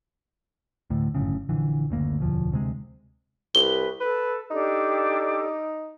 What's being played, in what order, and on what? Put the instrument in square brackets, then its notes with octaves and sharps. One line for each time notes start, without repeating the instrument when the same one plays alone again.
[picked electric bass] D2 A2
G1 F#2 A2 C#3
A#1 D3 E3
F#1 D2 A#3
E1 D2 F3
D2 C3 G#3
[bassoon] C2 [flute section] B4 [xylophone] G7
[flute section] A4 [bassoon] B4
[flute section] D4 G4 A4 [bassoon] D#4